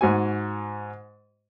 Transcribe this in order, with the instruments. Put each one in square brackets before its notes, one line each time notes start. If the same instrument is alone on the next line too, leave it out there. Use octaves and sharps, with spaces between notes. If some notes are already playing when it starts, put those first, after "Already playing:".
[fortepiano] G#2 F#4 G#5